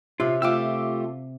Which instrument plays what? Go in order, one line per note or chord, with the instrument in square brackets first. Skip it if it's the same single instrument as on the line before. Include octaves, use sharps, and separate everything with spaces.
[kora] C3 [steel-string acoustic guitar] C#4 [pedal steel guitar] F4
[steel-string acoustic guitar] A3 F4 G4 [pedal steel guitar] D6 E6